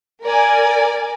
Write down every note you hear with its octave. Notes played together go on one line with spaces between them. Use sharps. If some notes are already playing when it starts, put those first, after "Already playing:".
A#4 D5 G#5